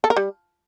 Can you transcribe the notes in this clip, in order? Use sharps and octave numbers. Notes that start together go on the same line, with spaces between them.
A4
A#4
G3